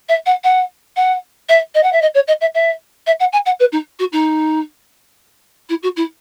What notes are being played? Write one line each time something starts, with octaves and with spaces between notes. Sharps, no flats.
E5
F#5
F#5
F#5
E5
D#5
F#5
E5
D#5
C#5
D#5
E5
E5
E5
F#5
G#5
F#5
B4
D#4
F#4
D#4
E4
F#4
E4